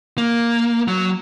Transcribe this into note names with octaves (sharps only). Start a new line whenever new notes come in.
A#3
F#3